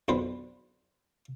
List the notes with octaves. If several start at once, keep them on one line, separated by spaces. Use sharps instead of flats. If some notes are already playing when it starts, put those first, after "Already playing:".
B1 F2 D3 B4 C5